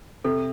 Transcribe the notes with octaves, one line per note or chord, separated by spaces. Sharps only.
C3 A4